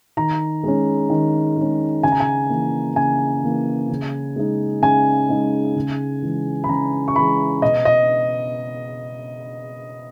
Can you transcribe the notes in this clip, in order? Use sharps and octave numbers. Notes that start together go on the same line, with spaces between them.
D#3 A#5
G#3 C#4
D#3
G#3 C#4
C#3 G#5
A#5
G#5
E3 A#3
C#3 G#5
E3 A#3
C#3
G#3 D#4
C#3 G#5
G#3 D#4
C#3
E3 G#3
B5
C#3 A#5
C#6
E3 G#3 B5
B2 D#5
D#5